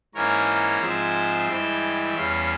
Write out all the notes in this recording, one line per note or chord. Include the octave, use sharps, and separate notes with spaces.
G#2 E3 A#3 C#4 A#4 C#5
G#2 F3 G#3 C4 C5 E5
G2 E3 G#3 E5 G5
E2 E3 G3 C#4 C#5 F5